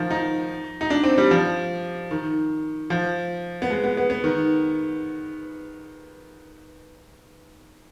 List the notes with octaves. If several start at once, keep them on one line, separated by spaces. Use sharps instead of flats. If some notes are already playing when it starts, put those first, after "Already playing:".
Already playing: D#3 F3
D#4
D#4
D4
C4
G3
F3
D#3
F3
B3
G#3
B3
B3
B3
D#3